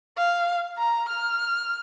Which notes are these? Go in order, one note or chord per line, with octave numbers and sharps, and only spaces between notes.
F5
A#5
F6